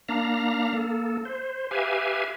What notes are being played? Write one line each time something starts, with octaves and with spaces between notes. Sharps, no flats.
A#3 D4 F5 A#5
A#3 A4
C5
G4 B4 E5 F5 G#5